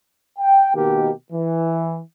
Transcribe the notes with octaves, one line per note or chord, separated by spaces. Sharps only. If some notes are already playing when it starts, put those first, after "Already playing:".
G5
B2 D#3 A#3 G4
E3